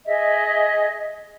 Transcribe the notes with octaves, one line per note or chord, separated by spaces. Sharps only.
G#4 D#5 E5